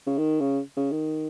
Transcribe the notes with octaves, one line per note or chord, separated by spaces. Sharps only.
C#3
D#3
C#3
C#3
D#3